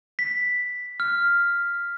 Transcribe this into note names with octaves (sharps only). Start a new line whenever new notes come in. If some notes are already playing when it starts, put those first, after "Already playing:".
B6
F6